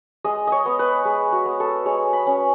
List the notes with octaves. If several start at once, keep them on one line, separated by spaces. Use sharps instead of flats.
G#3 D#5
C#5 D#5
B3
B4
G#3
F#4
B3
A4
G#3 C#5
B5
C#4